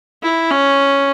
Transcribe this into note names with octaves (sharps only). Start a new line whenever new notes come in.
E4
C#4